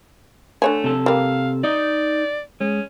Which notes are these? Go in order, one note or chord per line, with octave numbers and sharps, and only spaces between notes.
D3 A3 C#5 G#5
C3 A4
G3 A#3 F5
D#4 D5 D#5
G#3 C#4